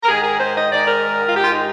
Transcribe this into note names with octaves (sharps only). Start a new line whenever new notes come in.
A#4
G#2 D#3 G#4
G#4
C5
D#5
G#2 D#3 D5
A#4
F4
G#2 D#3 G4
F4
D#4